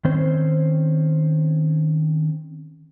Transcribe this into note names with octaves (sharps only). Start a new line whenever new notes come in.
D#3 C4 C#4 C5